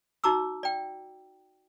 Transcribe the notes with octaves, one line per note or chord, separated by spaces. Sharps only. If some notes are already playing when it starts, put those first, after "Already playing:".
D#4 F#4 A#5 D6 E6
D5 G5